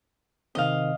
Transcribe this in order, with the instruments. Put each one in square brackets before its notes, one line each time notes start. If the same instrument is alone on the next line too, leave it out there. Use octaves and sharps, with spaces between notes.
[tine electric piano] C3 D#3 C4 [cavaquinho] D#5 F5